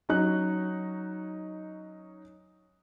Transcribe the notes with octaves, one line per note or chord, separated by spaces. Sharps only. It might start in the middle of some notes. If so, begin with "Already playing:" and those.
F#3 C#4 D#4 F#6